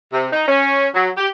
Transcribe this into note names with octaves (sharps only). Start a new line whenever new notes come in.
C3
D#4
C#4
F#3
G4